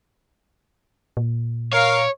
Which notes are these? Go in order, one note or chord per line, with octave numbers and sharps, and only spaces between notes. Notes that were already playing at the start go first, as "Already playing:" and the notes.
A#2
A#4 C#5 F5